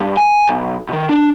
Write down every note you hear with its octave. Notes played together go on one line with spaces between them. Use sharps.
G2
G#5
B1
B2 D#3
D4